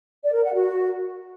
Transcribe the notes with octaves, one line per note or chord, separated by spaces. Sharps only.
D5
A#4
F#5
F#4